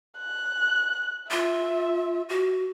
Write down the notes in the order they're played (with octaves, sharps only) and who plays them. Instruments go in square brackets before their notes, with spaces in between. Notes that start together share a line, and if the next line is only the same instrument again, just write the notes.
[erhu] F#6
[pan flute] F4 [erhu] E5
[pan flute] F#4